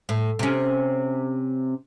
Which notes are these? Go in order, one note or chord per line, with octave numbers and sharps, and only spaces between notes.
A2
C3 C#4